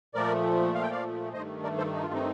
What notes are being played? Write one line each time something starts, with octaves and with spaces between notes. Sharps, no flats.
A#2 F3 A3 A#4 D5
F5
G5
D5 F5
G2 D#3 A3 C5 D#5
A#4 D5
A4 C5
D#4
F4
C4 D#4